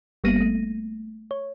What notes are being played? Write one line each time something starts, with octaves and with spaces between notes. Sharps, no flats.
G1 G3 A#3 B3 A#6 D#7
A3
C#5